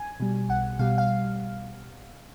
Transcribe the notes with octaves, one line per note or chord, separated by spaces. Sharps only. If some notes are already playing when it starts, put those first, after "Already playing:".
Already playing: G#5
B2 G3
B1 F#5
B2 G3 F5
F5